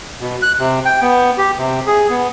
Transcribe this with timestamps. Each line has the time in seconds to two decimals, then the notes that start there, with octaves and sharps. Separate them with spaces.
0.21 B2
0.42 F#6
0.59 C3
0.85 G5
1.01 B3
1.38 G4
1.58 C3
1.87 G#4
2.10 B3